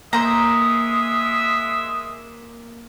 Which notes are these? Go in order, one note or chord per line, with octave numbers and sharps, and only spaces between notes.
G#3 A#3 C5 E5 A#5 D#6